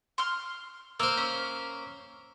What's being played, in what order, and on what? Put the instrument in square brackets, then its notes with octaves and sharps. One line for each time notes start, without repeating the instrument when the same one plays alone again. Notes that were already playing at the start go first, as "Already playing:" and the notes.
[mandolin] C6 F6
[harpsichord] A#3 C5 [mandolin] E6
[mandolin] C#4